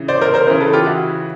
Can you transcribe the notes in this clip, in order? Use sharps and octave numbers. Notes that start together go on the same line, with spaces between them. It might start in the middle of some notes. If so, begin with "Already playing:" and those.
Already playing: C#3 E3
C5 D5
A#4 C5
A#4 C5
C#3 E3 A#4 C5
A4 B4
F4 G4
E4 F#4